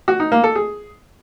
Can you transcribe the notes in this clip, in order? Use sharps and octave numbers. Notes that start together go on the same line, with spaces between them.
F#4
D#4
A#3
A4
G#4